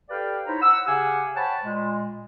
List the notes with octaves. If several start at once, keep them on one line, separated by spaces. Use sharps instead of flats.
G4 A4 B4 D5 F5 G5
D#4 E4 C5 C#5 A#5 B5
F#5 E6
C#3 G4 F5 F#5 G#5
C5 C#5 F#5 G5 A5 B5
A#2 G#3